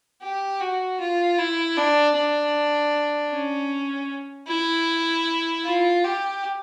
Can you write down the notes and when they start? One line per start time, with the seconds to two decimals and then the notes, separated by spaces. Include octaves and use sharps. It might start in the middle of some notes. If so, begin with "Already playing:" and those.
0.22 G4
0.61 F#4
1.00 F4
1.38 E4
1.77 D4
2.16 D4
3.32 C#4
4.48 E4
5.65 F4
6.04 G4